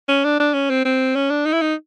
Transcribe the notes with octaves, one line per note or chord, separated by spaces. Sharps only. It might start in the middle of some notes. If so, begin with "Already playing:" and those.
C#4
D4
D4
C#4
C4
C4
C#4
D4
D#4
E4
D#4